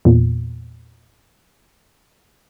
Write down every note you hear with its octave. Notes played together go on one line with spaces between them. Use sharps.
E2 A#2